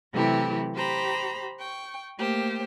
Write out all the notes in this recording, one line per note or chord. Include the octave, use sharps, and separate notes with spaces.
C3 E3 F#3 A3 E4 G4
G4 C5 A#5 B5
G5 C#6
A3 A#3 G4 C5